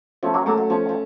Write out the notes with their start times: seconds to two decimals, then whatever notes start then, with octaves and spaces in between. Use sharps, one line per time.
0.23 F3 A3 C#4
0.34 F#3 A#3
0.46 F#3 A3 A#3
0.58 F#3
0.70 F3 C#4
0.89 F3